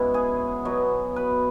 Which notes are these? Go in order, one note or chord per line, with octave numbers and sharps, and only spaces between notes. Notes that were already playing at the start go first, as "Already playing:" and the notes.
Already playing: G#2 C#3 G#3 B3 E4 F#4
G#4
B2 F#3 B3
B4